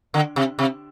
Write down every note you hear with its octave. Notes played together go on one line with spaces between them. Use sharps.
D3
C3
C3